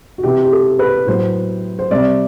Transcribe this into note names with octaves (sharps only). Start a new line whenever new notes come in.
F#4
C3 E3 B3 G4
G4
A4
B4
A2 F#3 B3 C5
C5
C3 G3 C4 D5